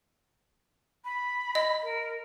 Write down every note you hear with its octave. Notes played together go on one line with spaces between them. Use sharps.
B5
D#5
A#4